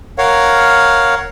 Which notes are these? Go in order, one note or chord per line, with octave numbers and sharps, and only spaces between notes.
A#4 C#5 F5 F#5